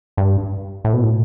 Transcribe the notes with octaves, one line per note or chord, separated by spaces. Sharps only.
G2
A2
B2
A2